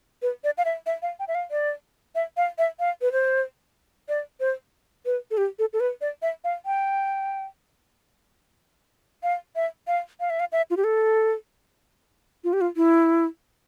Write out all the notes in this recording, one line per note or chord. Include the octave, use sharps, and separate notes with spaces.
B4
D5
F5
E5
E5
F5
G5
E5
F5
D5
E5
F5
E5
F5
B4
C5
D5
C5
B4
A4
G4
A4
A4
B4
D5
E5
F5
G5
F5
E5
F5
F5
E5
F5
E5
F4
G4
A4
F4
G4
F4
E4